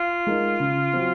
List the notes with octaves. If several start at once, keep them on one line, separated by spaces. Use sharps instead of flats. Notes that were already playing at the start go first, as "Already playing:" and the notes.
Already playing: F4
G#3 D#4 A#4
C#3
F#3 C4